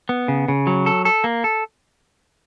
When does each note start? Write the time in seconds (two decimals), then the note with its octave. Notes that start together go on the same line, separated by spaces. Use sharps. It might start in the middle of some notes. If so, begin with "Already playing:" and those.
0.09 B3
0.28 C#3
0.48 C#3
0.67 F#3
0.86 A4
1.05 A4
1.24 A#3
1.44 A4